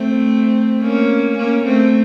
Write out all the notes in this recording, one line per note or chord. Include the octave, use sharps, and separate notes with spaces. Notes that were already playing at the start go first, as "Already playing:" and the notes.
Already playing: A3 C4
A#3 C#4
A#3 C#4
A3 C4